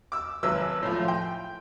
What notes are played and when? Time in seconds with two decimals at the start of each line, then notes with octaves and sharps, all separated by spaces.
0.12 D6 E6
0.43 G#1 F#3 B4 E6
0.83 A2 F3
1.04 G5 C6